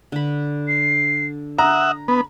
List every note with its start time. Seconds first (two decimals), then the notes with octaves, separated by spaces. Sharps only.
0.12 D3 B5
0.68 C7
1.59 E5 F#5 A#5 D#6
2.08 B3 B5